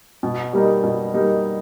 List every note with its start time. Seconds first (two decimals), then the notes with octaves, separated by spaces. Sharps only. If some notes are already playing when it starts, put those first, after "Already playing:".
0.23 B2
0.53 G3 A#3 D#4
0.84 B2
1.14 G3 A#3 D#4